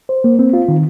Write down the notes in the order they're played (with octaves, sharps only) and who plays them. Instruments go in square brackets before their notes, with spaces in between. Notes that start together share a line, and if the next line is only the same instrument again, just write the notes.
[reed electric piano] C5
A#3
C4
F4
D#3